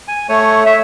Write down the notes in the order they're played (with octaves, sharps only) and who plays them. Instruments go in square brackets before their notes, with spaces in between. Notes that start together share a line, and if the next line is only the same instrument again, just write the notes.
[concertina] G#5
A3 C#5
[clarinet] E5